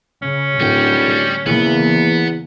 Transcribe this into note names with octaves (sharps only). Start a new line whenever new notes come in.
C#3 C#4
D1 A2 D3 G3 G5
E2 C#3 E3 A#3 B3